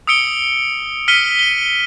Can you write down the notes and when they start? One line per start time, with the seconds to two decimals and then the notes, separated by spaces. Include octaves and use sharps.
0.07 D#6 E6 C#7 D7 G7
1.08 F6 B6 C#7 D#7 G7
1.39 D#7 G7